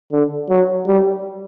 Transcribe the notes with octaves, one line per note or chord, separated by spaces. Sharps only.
D3
F#3
G3